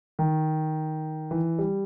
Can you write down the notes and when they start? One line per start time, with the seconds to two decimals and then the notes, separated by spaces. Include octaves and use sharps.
0.19 D#3
1.31 E3
1.59 G3